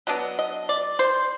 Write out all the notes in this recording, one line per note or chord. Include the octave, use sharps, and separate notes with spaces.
F#3 B3 D4 D#5
D#5
D5
C5